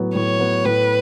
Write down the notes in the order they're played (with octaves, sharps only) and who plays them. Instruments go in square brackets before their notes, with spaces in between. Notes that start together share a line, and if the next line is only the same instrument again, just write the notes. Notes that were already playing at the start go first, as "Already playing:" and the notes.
Already playing: [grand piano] A2 F#3 B3
[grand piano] A2 [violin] C#5
[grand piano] F#3 B3
[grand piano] A2 [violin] B4